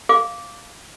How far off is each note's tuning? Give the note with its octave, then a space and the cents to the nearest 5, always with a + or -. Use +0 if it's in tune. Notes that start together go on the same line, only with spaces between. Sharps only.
F5 +0 D6 -10